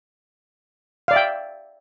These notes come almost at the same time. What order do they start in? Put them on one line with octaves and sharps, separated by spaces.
F5 D5 E5 G5